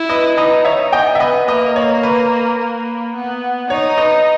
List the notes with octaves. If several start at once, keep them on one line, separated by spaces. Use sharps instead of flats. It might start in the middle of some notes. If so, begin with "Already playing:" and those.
Already playing: E4
B4 D#5
D#4 B4 D#5
C#5 E5
B3 D#5 G5
E5
B4 D#5
A#3 B4 D#5
C#5
B4
A#3
B3
D#4 C#5
B4 D#5